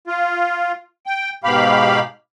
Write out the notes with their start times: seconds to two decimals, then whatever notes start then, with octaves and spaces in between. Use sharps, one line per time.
0.07 F4
1.06 G5
1.44 G#2 B2 G4 F5 B5